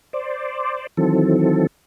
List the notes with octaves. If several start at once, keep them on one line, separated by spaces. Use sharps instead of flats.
C5 D5
D#3 E3 F#3 C4 A4